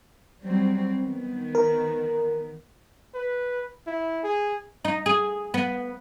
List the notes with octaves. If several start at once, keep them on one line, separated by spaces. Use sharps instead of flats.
F#3 G3 C4
D#3 B3
A#4
B4
E4
G#4
D#4
G#4
B3